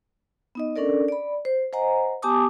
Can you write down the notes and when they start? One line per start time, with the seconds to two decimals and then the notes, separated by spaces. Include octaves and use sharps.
0.55 B3 D#4 D#5
0.76 C#4 D4 A4 A#4 D5
1.08 D5 B5
1.45 C5
1.73 C5 D#5 F#5 G#5 A#5
2.22 B3 G4 G#5 A5 D6 D#6